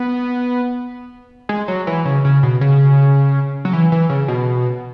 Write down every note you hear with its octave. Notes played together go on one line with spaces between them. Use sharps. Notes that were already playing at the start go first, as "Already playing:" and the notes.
Already playing: B3
G#3
F#3
E3
C#3
C#3
B2
C#3
F#3
E3
E3
C#3
B2